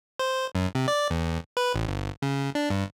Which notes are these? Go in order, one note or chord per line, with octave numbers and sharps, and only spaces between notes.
C5
F#2
C3
D5
E2
B4
A1
G1
C#3
D4
G2